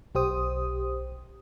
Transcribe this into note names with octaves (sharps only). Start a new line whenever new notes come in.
B1 G4 C5 D#6